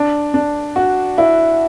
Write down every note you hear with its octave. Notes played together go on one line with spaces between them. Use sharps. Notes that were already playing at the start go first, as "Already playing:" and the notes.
Already playing: D4
D4
F#4
E4